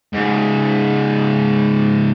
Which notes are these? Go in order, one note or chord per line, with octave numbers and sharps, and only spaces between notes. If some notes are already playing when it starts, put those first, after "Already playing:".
G#2 C#3